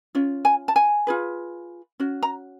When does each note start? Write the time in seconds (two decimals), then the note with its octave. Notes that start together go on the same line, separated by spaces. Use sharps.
0.15 C#4 F4
0.45 G#5
0.68 A5
0.76 G#5
1.07 F4 G#4 B4
2.00 C#4 F#4
2.23 A#5